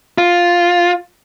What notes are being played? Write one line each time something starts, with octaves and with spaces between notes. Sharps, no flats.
F4